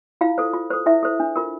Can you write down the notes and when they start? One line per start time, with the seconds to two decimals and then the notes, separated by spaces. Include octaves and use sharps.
0.21 E4 F4 F5
0.38 A4 C5
0.54 F4
0.70 A4 C5
0.86 E4 E5
1.03 A4 C5
1.20 D4
1.36 F4 A#4